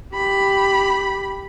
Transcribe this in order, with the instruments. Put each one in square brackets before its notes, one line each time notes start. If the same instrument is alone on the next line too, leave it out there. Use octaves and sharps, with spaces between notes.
[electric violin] G4 B5